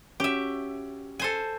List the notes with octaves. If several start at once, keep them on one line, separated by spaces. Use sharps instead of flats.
C#4 F#4 G4 E5
A4 C5 G#5